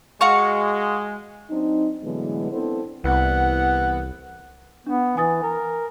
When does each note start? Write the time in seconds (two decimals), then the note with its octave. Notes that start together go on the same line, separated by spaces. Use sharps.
0.21 G#3 F#4 F5 C#6
1.51 F#3 C4 D4 D#4
2.04 A2 D3 E3 F#3 G#3 B3
2.52 B3 C4 D4 E4 A4 C5
3.04 C2 E3 B3 F#5
4.87 B3 D4
5.17 E3 G#5 D#6 A6
5.43 A#4